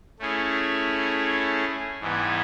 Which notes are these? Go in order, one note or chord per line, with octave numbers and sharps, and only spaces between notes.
A3 C#4 E4 G#4
G#2 E3 G3 B3